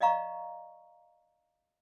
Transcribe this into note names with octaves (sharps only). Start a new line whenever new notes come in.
D5 D#5 F5 A#5 C#6